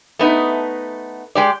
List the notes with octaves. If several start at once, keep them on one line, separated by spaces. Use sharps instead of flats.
A3 B3 D#4
G#3 G4 D5